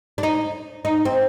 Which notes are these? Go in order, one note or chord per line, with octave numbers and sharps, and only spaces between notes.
D4
D#4
D#4
C4